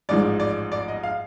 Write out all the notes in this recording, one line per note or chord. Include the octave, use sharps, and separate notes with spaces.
A1 G#2 F3 D5
D5
D5
D#5
F5